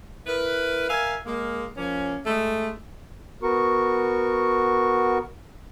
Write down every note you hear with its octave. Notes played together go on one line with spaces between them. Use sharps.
E4 A#4 B4
A#4 E5 F5 G#5
G#3 A#3
F3 A#3 C#4
G#3 A3
B3 F#4 A#4 C#6